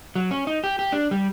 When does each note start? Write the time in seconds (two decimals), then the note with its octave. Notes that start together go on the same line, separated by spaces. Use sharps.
0.15 F#3
0.31 C#4
0.47 D#4
0.64 G4
0.79 G4
0.92 D4
1.11 G3